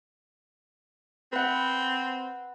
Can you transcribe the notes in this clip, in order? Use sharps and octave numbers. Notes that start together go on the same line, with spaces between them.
C4 B4 F#5